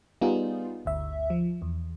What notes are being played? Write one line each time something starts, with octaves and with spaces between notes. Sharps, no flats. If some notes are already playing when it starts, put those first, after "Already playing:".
G3 B3 D#4 F4 G#4
G1 D2 E5
F3
E2